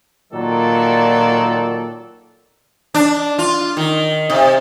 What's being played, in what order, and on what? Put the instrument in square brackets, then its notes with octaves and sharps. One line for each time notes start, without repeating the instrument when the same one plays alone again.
[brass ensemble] A#2 D#3 F#3 F4 A4 D5
[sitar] D4
F4
D#3
C3